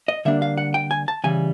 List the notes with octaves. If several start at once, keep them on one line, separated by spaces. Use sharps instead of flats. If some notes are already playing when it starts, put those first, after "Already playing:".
D#5
D3 G3 A#3 D4 E5
F5
F#5
G5
G#5
A5
C#3 E3 G3 G#5